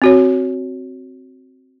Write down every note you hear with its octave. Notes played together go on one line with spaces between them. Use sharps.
C4 F#4 C#5